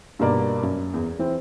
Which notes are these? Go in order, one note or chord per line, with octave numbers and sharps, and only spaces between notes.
G2 B2 A#3 D5
F#2
E2
E3 C4